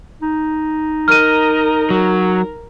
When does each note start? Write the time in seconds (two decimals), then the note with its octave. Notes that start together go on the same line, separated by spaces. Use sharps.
0.21 D#4
1.08 A#4 D#5 F6 D#7
1.90 F#3 A#4